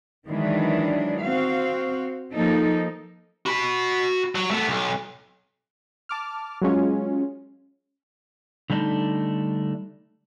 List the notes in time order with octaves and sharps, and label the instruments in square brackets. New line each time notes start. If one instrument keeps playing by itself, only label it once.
[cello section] D#3 E3 F#3 G#3 D4
C4 F#4 F5
F3 A#3 D#4 A4
[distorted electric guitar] F#4 B5
F#3
A3 B3
B1
[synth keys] A5 D6 F6
F#3 G#3 C#4 F4
[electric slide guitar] D3 G3 A3 D4 D#4